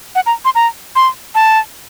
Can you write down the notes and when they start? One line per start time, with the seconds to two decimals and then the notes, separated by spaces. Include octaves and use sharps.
0.15 F#5
0.26 A#5
0.45 C6
0.55 A#5
0.96 C6
1.35 A5